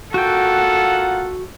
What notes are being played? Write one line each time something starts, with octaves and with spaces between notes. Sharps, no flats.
A#3 F4 F#4 A4 F#5 G5